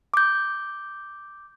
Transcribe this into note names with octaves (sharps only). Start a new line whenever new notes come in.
D6 G6